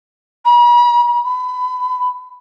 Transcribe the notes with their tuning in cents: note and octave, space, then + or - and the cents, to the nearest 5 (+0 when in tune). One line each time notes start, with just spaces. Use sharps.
B5 -45
B5 +25